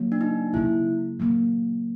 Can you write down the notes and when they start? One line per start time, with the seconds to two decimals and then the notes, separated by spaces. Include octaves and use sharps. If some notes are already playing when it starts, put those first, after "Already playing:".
Already playing: C#3 F#3 A#3
0.12 D4
0.21 D#4
0.53 C#3 F#3 A#3 E4
1.19 C#3 F#3 A#3